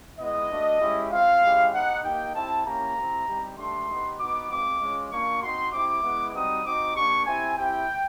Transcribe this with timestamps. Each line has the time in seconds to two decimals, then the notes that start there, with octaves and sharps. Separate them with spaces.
0.19 G#3 B3 E4 D#5
0.51 A3 D4 F#4
0.80 G#3 C#4 E4 G4
1.12 C4 F4 F5
1.43 G#3 C#4 E4 G4
1.73 B3 D#4 G4 F#5
2.04 A#3 D#4 G4 G5
2.35 C4 E4 G4 A5
2.65 A#3 C#4 E4 G4 A#5
2.96 C4 E4 G4
3.27 G3 C4 D#4 G4
3.57 A3 D4 G4 C6
3.89 B3 D#4 G4
4.19 B3 D#4 F#4 D6
4.50 G#3 C4 F4 D6
4.81 G#3 C#4 F4
5.12 A#3 D4 F4 C#6
5.42 C4 D#4 F#4 C6
5.72 C4 E4 G4 D6
6.03 G#3 B3 E4
6.34 G3 C4 D#4 F#4 D#6
6.65 C4 D#4 F#4 D6
6.96 A#3 D4 G4 C#6
7.26 C4 E4 G4 G#5
7.57 C4 E4 G4 G5